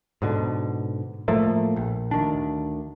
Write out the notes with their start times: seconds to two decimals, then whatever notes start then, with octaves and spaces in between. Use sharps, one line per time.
0.22 G#2 B2 D3
1.28 A2 F3 A3 A#3
1.76 A#1
2.11 D2 D#3 D4